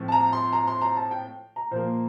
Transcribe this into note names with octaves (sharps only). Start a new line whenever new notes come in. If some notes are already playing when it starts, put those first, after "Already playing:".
Already playing: A2 F3 C4
A5
A#5
C6
A#5
C6
A#5
A5
G5
A#5
A#2 F3 A#3 C5